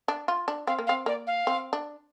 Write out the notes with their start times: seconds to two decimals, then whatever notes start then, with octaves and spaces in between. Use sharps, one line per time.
0.08 D4
0.28 F4
0.48 D4
0.67 C4 F5
0.79 A#3
0.87 F5
0.89 C4
1.06 A#3 D5
1.27 F5
1.47 C4
1.73 D4